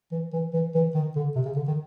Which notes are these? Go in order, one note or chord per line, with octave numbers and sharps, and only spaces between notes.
E3
E3
E3
E3
D#3
D3
C3
C#3
D3
D#3